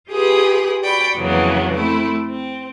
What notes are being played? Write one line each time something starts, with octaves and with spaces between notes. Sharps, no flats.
F4 G4 G#4 B4 D#6
F#4 D5 G5 B5
F2 C#3 E3 F#3 A#3 B3
A3 C4 E4
C4